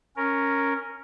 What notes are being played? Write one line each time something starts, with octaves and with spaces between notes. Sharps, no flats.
C#4 A#4